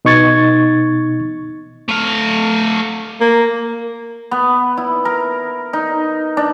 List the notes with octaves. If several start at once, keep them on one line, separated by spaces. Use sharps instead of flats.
B2 D#4 C#6 G#6 A6
A3 F5
A#3
B3
E4
A#4
D#4
D4